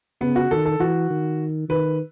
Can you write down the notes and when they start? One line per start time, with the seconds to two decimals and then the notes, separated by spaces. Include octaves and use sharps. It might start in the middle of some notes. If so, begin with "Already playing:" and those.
0.21 C#3 B3
0.36 F#4
0.51 D#3 A4
0.66 A4
0.80 E3 F#4
1.10 D#3
1.69 D#3 B4